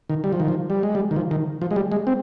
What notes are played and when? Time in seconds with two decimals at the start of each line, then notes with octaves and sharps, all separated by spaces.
0.10 D#3
0.24 G3
0.33 F3
0.40 D#3
0.48 F3
0.70 G3
0.83 G#3
0.95 G3
1.11 D#3
1.16 F3
1.31 D#3
1.62 F3
1.71 G#3
1.76 G3
1.92 G#3
2.07 C4